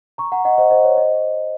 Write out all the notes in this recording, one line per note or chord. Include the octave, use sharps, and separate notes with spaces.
A#5 C#6
F#5 A#5
D#5 F#5
C5 D#5
C5 D#5
C#5
C5 D#5